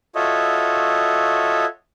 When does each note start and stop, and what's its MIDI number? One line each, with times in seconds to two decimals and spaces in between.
0.15 1.65 65
0.15 1.65 66
0.15 1.65 69
0.15 1.65 73
0.15 1.65 75
0.15 1.65 76